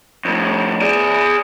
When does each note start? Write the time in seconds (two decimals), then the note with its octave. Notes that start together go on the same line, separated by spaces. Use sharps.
0.25 F2 A2
0.81 G#4 D5